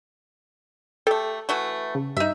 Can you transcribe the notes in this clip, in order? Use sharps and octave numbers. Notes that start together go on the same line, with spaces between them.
A3 G4 A4
E3 A3 F#4
C#3
G2 D#4 E5